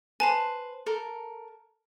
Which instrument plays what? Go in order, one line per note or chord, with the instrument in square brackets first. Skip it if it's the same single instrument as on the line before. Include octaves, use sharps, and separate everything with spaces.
[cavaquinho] B4 C5 [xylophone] G#5 A5
[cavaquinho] A4 A#4